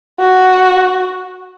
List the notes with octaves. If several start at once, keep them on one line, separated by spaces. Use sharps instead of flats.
F#4